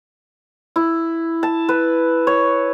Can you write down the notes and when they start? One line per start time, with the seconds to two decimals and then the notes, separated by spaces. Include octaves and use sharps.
0.76 E4
1.43 A5
1.69 B4
2.27 C#5